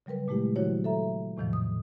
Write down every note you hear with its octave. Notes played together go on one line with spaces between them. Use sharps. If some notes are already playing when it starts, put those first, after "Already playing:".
C#3 F#3 G3 A#4 B4
A#2 G#3 A3 E4 G4
D#3 F#3 E4 F#4 C5 C#5
A4 E5 A#5
E2 A2 C3 D#3 F3
D#6